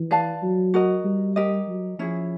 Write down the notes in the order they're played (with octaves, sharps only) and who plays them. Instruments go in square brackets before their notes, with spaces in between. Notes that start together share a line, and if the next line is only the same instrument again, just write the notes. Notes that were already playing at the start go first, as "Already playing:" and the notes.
Already playing: [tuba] E3
[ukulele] B4 D5 F5 A5
[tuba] F#3
[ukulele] F#4 A#4 D#5
[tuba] G3
[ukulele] G4 A#4 D#5
[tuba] F#3
[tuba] F3 [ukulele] C#4 E4 G#4